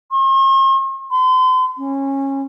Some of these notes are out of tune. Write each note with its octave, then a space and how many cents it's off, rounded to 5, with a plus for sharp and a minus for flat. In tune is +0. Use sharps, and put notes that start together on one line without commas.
C6 +45
C6 -40
C#4 -20